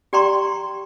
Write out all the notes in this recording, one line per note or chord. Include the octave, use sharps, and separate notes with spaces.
G4 D5 G5 A#5 C6 C#6